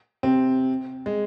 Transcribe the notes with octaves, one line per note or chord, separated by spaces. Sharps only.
C3 C4
G#3